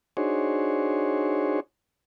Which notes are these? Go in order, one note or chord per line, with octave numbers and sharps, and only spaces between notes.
D4 D#4 F#4 G#4 C5 C#5